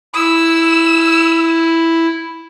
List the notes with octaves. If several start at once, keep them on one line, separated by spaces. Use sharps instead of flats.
E4 E6